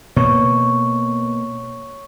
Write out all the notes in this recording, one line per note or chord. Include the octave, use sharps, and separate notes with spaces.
B2 A#3 C#5 C#6